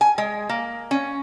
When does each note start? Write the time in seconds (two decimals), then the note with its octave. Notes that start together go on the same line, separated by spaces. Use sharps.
0.01 G#5
0.18 G#3
0.49 A#3
0.91 C#4